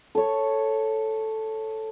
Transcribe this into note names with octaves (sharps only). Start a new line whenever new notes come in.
A4 C#5